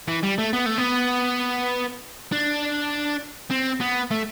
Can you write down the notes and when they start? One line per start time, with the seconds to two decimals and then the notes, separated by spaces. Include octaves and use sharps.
0.08 E3
0.23 G3
0.39 A3
0.53 B3
0.66 A3
0.78 B3
2.32 D4
3.51 C4
3.81 B3
4.11 A3